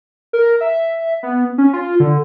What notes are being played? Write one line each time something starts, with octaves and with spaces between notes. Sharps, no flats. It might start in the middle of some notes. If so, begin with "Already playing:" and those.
A#4
E5
B3
C#4
F4
D3